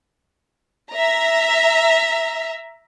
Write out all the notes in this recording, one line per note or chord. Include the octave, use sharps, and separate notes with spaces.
E5 A#5